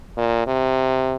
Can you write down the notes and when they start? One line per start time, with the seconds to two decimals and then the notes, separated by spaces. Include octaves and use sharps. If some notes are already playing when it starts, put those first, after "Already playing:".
0.18 A#2
0.47 C3